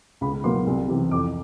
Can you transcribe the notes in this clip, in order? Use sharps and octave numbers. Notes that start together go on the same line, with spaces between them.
C#2 B5
B2 F#3 A#3 C6
C2
C3 E3
F2 D6